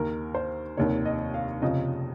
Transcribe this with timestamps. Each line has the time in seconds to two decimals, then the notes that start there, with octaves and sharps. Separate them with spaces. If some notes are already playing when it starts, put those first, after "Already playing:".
Already playing: D#2 D#3 A#4
0.35 C5
0.77 F1 D#2 D#3 C#5
1.06 D#5
1.34 F5
1.62 F1 F2 C#3 F3 D#5